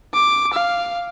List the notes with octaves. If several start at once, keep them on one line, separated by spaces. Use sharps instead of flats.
D6
F5